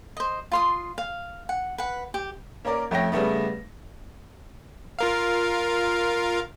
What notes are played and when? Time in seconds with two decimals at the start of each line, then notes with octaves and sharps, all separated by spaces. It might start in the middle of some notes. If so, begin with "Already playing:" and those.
0.17 C5 D#5
0.52 F4 C6 D#6
0.98 F5
1.49 F#5
1.78 B4 F#5
2.14 G4
2.65 A#3 C#4 A#4 D5
2.91 F2 A3 C#4 G5 A#6
3.12 C#3 G3 A3 B3
4.99 F4 A#4 F5